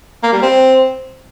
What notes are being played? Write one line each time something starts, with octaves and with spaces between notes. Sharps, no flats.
A#3
G3
C4